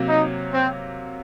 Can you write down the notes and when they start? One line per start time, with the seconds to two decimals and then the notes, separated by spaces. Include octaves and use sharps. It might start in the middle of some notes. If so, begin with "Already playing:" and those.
Already playing: C3 F#3 A#3
0.09 D#4
0.54 C4